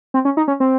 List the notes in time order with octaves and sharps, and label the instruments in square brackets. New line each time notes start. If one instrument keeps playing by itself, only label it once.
[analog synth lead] C4
C#4
D#4
C#4
C4